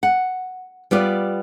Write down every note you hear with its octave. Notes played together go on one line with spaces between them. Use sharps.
F#5
G3 B3 F4 D5